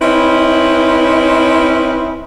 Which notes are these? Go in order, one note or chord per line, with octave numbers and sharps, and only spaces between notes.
C4 C#4 D#4 E4 B4